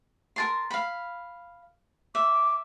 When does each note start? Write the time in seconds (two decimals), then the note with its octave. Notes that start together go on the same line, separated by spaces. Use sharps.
0.36 A#4 A5 C6
0.70 F5 B5
2.15 E5 D6